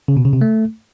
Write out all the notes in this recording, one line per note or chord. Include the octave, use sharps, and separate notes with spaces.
C#3
B2
C#3
C3
A3